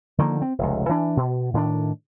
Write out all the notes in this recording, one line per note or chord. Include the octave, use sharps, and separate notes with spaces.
D3 D#3 F3 A#3
C4
F1 C#2
E3 D4
B2
A2 D#3 C#4 D4